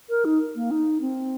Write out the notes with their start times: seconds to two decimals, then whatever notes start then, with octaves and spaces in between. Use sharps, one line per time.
0.10 A#4
0.25 D#4
0.56 A#3
0.71 D#4
1.01 C4